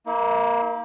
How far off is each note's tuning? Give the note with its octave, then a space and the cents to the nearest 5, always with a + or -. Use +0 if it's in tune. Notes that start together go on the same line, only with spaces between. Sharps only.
A#3 +0 E4 -45